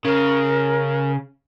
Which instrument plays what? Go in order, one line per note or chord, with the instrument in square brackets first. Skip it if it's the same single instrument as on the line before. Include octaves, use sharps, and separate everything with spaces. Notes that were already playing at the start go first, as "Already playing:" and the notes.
[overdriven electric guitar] C#3 [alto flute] A#4